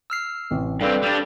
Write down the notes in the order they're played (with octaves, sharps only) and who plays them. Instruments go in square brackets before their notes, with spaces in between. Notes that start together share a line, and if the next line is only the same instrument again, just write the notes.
[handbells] E6 F6 C7
[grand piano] A1 C3
[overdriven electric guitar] G2 C4 [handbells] A4 F5 G5 [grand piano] B4 D5
[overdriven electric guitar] G3 D4